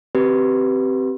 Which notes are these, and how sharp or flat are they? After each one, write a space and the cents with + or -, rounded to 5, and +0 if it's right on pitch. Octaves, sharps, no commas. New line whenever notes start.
C4 +0 G4 -20 B4 -5